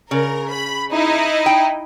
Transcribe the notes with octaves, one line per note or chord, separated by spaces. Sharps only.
C#3 A#4
B5
D#4 E4 D#5
G5